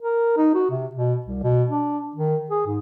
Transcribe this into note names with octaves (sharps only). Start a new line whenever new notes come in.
A#4
D#4
F#4
C3
B2
C2
B2
D4
D#3
G#4
G#2